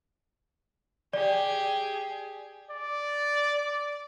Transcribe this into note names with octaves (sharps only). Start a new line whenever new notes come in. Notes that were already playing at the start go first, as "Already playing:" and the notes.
G4 G#4 D5
D5